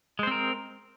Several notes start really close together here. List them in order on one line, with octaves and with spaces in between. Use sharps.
G#3 C5 C4 A#4